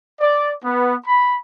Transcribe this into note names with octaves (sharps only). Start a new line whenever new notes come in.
D5
B3
B5